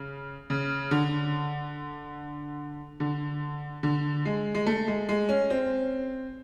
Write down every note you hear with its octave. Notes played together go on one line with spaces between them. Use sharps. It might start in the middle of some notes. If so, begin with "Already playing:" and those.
Already playing: C#3
C#3
D3
D3
D3
G#3
G#3
A3
G#3
G#3
C#4
C4